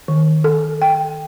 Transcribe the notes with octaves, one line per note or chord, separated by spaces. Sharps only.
D#3
A4
G5